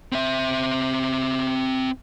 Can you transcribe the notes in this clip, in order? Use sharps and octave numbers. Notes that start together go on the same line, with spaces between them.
C4 E5